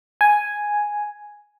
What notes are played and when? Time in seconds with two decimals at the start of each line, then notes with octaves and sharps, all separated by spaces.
0.21 G#5